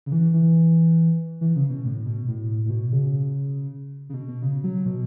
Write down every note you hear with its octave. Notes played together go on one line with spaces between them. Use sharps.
C#3
E3
E3
E3
C#3
B2
A2
B2
A2
A2
B2
C#3
C#3
B2
B2
C#3
F#3
B2